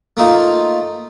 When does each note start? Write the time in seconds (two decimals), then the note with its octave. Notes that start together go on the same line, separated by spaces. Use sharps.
0.17 A3 A#3 D#4 F4